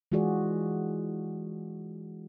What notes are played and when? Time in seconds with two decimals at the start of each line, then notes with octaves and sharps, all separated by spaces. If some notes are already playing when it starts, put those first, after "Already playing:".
0.12 E3 G#3 F4 F#4 G#4 D5